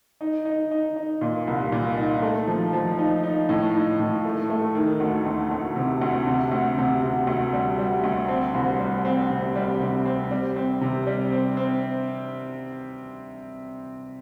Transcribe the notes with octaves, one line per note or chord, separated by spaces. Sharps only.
D#4
D#4
D#4
D#4
A#2
C2
A#2
D#4
A3
F3
F3
D#4
D#4
A2
D#4
A2
A3
A3
D#3
D2
D2
D2
C3
D2
C3
D2
C3
C3
D2
G3
G3
D2
C4
C2
G3
C4
C3
G3
C3
C4
G3
C4
C3
G3
C4
C4